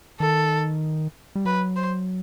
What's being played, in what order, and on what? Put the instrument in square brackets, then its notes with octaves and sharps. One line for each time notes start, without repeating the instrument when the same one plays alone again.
[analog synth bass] D#3 [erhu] A4
[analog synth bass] G3
[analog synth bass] F#3 [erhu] B4
[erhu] C5